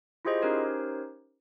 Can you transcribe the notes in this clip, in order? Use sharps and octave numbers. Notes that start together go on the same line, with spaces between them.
E4 F4 G4 G#4 C5 D#5
C#4 D#4 G4 A#4 C5 C#5